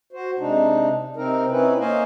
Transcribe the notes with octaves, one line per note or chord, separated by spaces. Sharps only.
F#4 C5
C3 G#3 D4 D#4
C3 C4 D#4 A#4
C4 C#4 D#4 E4 B4
A#3 C5 C#5 D#5 F5 G#5